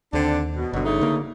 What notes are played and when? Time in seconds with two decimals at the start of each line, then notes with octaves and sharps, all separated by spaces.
0.13 D#2 D3 C4 D4
0.56 B2
0.73 G1 B2 D3 F#3
0.85 C#3 A3 D#4
1.01 D3 A#3